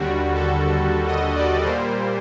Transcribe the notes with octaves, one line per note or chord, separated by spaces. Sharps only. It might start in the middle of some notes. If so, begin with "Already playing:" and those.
Already playing: D#2 D3 G3 F#4
A4
D#5
D5
A#2 G3 A#3 C5